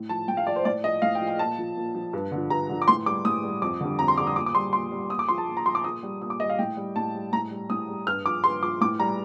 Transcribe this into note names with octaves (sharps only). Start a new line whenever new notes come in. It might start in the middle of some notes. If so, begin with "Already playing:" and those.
Already playing: A2
F3 A5
A2 G5
F5
F3 D5
C5
A2 D5
F3 D#5
A2 F5
G5
F3
G5
A#2 A5
F3
A#2
F3
G2
D3 F3
G2 A#5
D3 F3
D6
A2 C6
G3 D6
A2 D#6
G3
F2 D6
D3 G3
F2 A#5
C6
D3 G3 D6
D#6
A#2 D6
D6
G3 C6
A#2 C6
G3
A#2 D#6
D6
F3 C6
A5
A#2
A#5
F3 C6
D6
A#2 D#6
G3
A#2 D#6
D6
G3 D#5
F5
A2 G5
G3
A2 A5
G3
A2 A#5
G3
A2 D#6
G3
G2 F6
F3 D6
G2 C6
F3 D6
A2 D6
G3 A#5